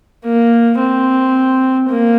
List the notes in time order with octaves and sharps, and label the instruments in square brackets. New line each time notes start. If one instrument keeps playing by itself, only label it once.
[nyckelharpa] A#3
C4
A#3